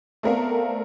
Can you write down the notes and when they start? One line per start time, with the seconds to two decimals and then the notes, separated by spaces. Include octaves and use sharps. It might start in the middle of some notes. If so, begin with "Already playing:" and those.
0.23 A3 B3 C4 A#4 D5 F5